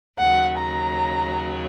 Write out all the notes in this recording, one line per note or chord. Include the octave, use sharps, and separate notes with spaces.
D#2 C#3 F#3 F#5
A#5